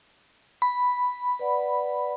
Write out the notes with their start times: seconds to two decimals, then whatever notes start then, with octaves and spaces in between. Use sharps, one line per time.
0.62 B5
1.39 B4 D5 F#5